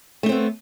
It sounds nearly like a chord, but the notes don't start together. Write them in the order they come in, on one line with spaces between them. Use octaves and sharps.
A3 D#4 C4 B3